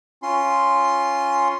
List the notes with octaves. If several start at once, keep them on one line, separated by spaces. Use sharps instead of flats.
C#4 F4 C6